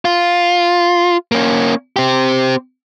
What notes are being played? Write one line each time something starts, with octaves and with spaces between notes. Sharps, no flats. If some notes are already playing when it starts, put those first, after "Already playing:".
F4
A#3 C#4
C4 G4